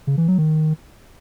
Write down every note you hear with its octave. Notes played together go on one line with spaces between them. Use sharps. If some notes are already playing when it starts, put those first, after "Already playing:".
C#3
E3
F#3
D#3